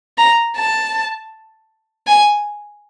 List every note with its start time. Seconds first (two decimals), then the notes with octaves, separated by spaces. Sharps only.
0.18 A#5
0.56 A5
2.07 G#5